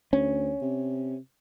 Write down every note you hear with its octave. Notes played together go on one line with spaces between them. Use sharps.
D2 C#4
C3